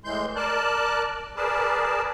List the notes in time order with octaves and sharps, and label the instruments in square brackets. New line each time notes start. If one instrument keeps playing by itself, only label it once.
[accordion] A2 E3 G#3 C6 G6
A#4 D5 A5 F#6
G#4 A#4 B4 D5 A5